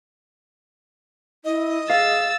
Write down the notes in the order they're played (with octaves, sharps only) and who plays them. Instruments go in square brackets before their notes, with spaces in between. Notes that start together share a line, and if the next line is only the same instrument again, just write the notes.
[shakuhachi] E4 [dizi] D#5
[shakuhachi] G#4 [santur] F5 [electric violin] E6 A6